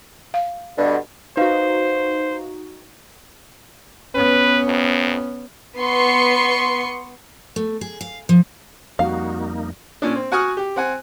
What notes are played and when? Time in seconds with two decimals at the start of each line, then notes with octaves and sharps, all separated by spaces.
0.34 F5
0.77 G2 B2 D3
1.37 D#4 F#4 B4 C5 F5
4.15 B3 C#4 B4
4.66 F2
5.79 B3 C6 C#6
7.56 A3
7.81 G#4
8.01 F5
8.29 F3
8.99 F2 G3 A#3 D#4 F#4 F5
10.02 A#2 C#4 D4
10.16 C4
10.32 F#4 F#5 G#5 C#6 D#6 F6
10.57 G4
10.76 C4 F#5 G#5